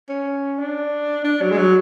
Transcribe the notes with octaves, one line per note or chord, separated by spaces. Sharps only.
C#4
D4
D4
F#3
G#3
F#3